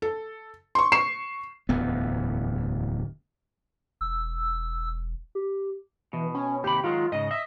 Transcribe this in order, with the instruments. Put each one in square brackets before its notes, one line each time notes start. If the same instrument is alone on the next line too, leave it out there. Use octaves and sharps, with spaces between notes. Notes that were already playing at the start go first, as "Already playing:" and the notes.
[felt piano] A4
C6 C#6
C#6 C7 E7
[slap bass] D1 E2 B3
[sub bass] E1 [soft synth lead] E6
[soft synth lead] G4
[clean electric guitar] B2 [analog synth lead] E3
[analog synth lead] C#4
[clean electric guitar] D#2 C3 B5 [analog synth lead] G4
[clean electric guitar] D#3 F#3 G#3 [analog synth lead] F4
[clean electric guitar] G#2 C#3 [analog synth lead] D#5
[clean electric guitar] D#5 [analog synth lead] E5